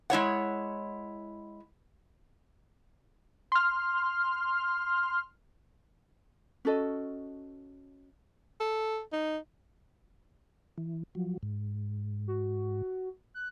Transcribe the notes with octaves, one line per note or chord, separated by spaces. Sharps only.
G#3 E4 C#5 F#5
C6 F6
C#4 F#4 A4 D#5
A4
D#4
E3
F3 F#3
G#2
F#4
F#6